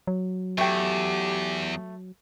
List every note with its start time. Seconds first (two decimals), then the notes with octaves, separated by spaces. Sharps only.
0.07 F#3
0.58 E2 A3 G4 G5